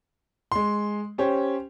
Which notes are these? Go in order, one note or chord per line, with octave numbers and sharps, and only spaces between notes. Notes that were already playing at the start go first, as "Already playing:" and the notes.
G#3 C6
C#4 G4 C5 C#5